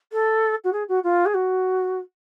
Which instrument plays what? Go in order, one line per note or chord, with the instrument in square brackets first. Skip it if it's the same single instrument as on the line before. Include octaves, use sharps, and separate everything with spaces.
[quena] A4
F#4
G#4
F#4
F4
G#4
F#4